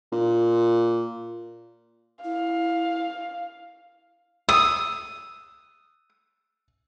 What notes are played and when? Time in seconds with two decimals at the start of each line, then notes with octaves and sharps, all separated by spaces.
0.12 A#2
2.24 E4 F5
4.49 D#6 E6